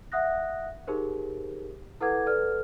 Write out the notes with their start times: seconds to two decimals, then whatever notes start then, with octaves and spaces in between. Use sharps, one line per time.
0.12 E5 F#5 D#6 F#6 A#6
0.87 D#4 G4 G#4 A#4 C5
2.01 E4 A4 B4 F#5 D6 G#6
2.26 A4 B4 D5 F6